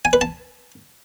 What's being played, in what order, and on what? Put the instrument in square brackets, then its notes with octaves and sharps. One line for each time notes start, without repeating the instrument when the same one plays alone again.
[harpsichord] G#5
B4
A5